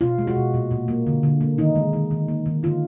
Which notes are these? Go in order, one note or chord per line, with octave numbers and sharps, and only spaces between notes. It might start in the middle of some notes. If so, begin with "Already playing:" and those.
B2 F4
G#3
F#4
B2
A#2
A#2
A#3
D3
D3
A#3
D#3 D#4
G#3
D#3
D#3
A#3
D#3
D3 F4